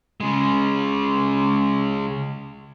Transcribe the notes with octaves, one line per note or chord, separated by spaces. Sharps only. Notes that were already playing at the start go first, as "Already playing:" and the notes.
C#3 G#3